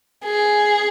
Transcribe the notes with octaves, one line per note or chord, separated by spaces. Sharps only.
G#4